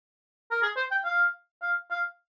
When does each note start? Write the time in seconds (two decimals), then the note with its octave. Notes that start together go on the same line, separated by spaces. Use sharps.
0.51 A#4
0.62 G#4
0.76 C5
0.91 G5
1.05 F5
1.62 F5
1.91 F5